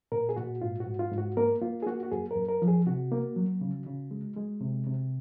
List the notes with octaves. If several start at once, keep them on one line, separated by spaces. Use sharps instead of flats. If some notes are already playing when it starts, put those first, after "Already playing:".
A#2 A#4
G#4
A#2 F#4
G#2 F4
F#4
G#2
F4
G#2
F#4
A#3 A#4
A#3 F4
G#4
A#3 F#4
F#4
F#2 G#4
A#4
F#2
A#4
F3
G#4
C3 F#4
A#3
F#3
C#3
C#3
G#3
G#3
C3
C3